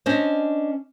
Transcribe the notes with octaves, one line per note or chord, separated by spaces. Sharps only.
C#4 D4 C5 D#5